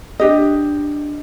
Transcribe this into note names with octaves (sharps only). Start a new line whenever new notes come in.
D4 G4 D#5